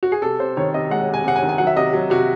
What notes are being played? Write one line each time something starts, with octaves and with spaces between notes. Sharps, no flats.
F#4
G#4
C3 A4
C3 C5
D#3 C#5
C3 D#5
G#3 F#5
C3
G#5
C3 F#5
G#5
D#3
G#5
F#3 F#5
E5
C3 D#5
F#3
C3 F#4